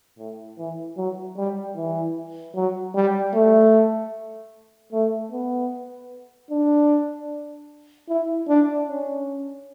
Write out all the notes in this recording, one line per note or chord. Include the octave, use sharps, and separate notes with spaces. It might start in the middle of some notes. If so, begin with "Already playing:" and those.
A2
E3
F#3
G3
E3
F#3
G3
A3
A3
B3
D4
E4
D4
C#4